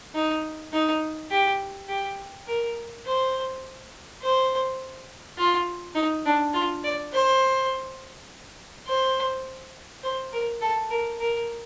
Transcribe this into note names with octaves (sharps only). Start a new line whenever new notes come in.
D#4
D#4
G4
G4
A#4
C5
C5
F4
D#4
D4
F4
D5
C5
C5
C5
A#4
A4
A#4
A#4